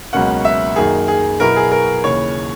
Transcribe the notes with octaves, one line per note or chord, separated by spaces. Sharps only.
C#2 B2 F#3 A#3 C#4 F#5
E5
F#2 D#3 A#3 G#4
G#4
B2 F#3 B3 E4 A#4
G#4
A#4
D#2 C#3 E3 C#5